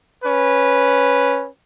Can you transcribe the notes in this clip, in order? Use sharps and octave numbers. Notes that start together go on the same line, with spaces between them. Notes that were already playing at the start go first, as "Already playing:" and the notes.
C#4 B4